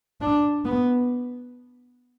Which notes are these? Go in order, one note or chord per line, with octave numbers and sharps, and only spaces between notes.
D4
B3